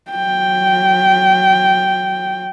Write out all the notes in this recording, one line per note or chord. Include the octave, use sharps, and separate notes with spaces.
F#3 G5